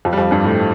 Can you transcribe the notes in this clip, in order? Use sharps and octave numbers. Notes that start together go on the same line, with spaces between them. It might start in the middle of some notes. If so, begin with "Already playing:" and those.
F2 F3
G3
F2 F3
G2 G3
A2 A3